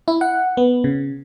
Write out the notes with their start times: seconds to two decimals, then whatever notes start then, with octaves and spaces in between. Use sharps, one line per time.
0.08 E4
0.21 F#5
0.57 B3
0.84 C#3